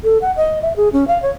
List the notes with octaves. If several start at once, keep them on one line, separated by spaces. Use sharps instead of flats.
A4
F#5
D#5
E5
G#4
C#4
F5
C#5